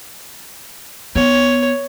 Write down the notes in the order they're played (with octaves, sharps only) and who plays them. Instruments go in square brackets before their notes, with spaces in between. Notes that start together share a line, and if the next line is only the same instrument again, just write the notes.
[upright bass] B3 [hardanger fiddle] C#5